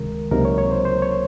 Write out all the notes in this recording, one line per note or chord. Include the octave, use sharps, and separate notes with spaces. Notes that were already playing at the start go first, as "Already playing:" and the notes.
Already playing: C#2 C3 D#3 G#3 A#4
C#2 C3 F#3 A#3 D#4 A#4
C#5
C#5
C5
C5
C#5